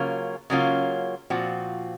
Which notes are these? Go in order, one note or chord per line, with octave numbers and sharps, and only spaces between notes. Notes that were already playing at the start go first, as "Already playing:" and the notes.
Already playing: C#3 F#3 A#3 C#4 F4
C#3 F#3 A#3 C#4 F4
A#2 F3 C4 F#4